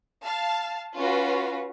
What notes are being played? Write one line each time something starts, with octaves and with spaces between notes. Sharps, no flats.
F5 A5
C#4 F4 F#4 B4